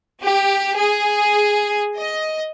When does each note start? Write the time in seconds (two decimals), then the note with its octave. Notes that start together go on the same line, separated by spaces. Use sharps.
0.23 G4
0.77 G#4
1.96 D#5